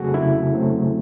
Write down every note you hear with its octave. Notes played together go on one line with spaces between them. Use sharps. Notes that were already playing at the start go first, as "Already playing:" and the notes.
Already playing: C#3 F#3 A3 C4 F#4 G#4 A4
C#3 E4
F#3 A3 C4